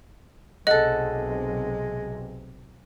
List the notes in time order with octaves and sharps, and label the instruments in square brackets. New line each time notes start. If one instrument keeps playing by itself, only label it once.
[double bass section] B1 C3 [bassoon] G#3 [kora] A4 F#5 [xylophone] D#5